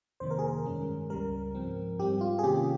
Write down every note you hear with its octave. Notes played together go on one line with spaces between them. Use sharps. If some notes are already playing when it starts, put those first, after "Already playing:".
F2 C3 D#3 A#3 C5
A#4
G#4
A#4
G2 D#3 G#3 C#4
C#2 C#3 G3 A#4
G#2 F3 C4
G#2 G3 C4 G4
F4
G#4
C3 D#3 A#3 C#4 G4